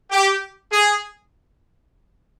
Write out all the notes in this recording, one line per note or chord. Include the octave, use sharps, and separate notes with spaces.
G4
G#4